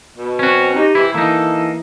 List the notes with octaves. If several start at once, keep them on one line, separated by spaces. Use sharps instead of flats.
B2
C4 C#4 F#4
D#4 G4
E3 C4 E4
E3 A#3 D#4 A4